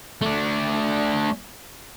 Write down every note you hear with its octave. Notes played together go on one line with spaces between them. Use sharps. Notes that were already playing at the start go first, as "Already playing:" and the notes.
A3 D4